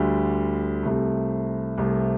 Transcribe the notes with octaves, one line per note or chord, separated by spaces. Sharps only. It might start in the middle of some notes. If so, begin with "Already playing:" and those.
Already playing: D2 D3 G3
C2 C3 A3
C2 C3 A3